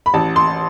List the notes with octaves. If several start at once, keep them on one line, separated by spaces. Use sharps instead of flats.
B5
A1 A5
C6